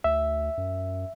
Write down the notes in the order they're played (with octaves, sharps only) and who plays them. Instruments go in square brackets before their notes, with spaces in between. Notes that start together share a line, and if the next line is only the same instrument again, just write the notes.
[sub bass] D2 [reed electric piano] E5
[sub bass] F#2